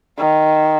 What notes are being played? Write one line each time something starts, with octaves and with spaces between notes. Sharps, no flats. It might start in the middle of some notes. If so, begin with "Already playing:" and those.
D#3